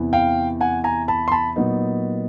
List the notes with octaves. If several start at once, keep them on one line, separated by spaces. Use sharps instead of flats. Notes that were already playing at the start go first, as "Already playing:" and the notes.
Already playing: E2 C3 E3
F5 G5
F#5 G#5
G#5 A#5
A5 B5
C6
A5 B5
A#2 F#3 B3 D#4